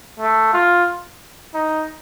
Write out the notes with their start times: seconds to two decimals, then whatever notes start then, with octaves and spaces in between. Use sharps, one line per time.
0.20 A3
0.53 F4
1.55 D#4